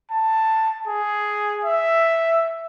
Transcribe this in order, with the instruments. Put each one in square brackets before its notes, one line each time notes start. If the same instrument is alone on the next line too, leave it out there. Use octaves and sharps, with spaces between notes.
[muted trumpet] A5
G#4
E5